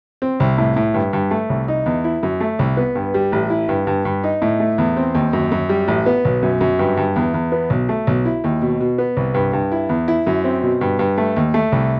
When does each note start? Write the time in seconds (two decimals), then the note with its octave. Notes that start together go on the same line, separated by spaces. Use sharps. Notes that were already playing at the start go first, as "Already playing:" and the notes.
0.22 C4
0.40 C2
0.58 A2
0.76 A2
0.94 G2
1.13 G2
1.31 A3
1.50 C2
1.68 D#4
1.86 E2
2.04 E4
2.23 F#2
2.41 A3
2.59 C2
2.77 B3
2.95 G2
3.14 G3
3.32 A1
3.50 E4
3.69 G2
3.87 G2
4.05 G2
4.24 D#4
4.42 A2
4.60 A3
4.78 E2
4.97 C4
5.15 D#2
5.33 F#2
5.52 F#2
5.69 G3
5.88 A1
6.06 B3
6.25 B1
6.43 F#2
6.61 F#2
6.79 G2
6.97 G2
7.16 E2
7.34 E2
7.52 B3
7.70 B1
7.89 A3
8.07 B1
8.25 E4
8.44 D#2
8.62 B2
8.80 B2
8.98 B3
9.17 C2
9.34 G2
9.53 G2
9.72 E4
9.89 E2
10.08 E4
10.27 F#2
10.44 C4
10.63 B2
10.81 G2
10.99 G2
11.18 A3
11.36 D#2
11.54 A3
11.72 C2